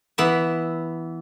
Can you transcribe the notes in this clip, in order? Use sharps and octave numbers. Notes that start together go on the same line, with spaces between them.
E3 B3 E5